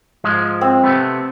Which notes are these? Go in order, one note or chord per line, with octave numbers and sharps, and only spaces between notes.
G#2 F3 G#3
C4
C3 A3 B3